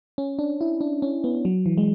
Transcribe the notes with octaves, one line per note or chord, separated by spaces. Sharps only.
C#4
D4
E4
D4
C#4
B3
F#3
E3
G#3